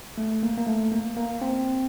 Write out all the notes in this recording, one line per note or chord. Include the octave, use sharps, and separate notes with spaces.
A3
A#3
A#3
A3
A#3
A#3
C4